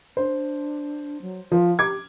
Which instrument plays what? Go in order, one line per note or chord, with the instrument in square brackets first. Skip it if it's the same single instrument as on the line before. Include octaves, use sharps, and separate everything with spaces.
[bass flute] D4 [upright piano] C5
[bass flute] F#3
[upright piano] F3 [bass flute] F4
[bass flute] G4 [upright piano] D6 G#6